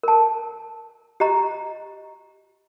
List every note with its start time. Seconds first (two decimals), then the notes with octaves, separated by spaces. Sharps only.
0.03 A#4 A5
1.20 G4 D#5 A#5